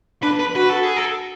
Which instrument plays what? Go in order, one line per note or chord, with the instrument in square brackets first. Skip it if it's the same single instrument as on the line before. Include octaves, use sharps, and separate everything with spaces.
[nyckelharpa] D4 [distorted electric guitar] B4
[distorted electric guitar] B4
[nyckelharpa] F#4 [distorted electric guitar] B4
[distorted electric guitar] A4
G#4
A4